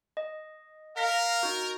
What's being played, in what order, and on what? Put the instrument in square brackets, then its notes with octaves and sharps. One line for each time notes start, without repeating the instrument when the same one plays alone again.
[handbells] D#5
[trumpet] A#4 [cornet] F5 [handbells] A#5 A#6 B6
[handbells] D#4 F#4